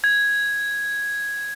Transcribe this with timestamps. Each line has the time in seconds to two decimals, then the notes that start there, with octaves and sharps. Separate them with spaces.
0.04 G#6